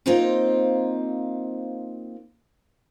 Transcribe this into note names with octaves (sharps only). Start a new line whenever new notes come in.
A#3 C4 D#4 F4 C5 F5